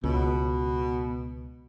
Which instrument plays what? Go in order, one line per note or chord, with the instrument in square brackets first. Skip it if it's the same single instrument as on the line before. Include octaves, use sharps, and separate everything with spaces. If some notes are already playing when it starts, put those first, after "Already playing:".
[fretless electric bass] C#2 [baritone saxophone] B2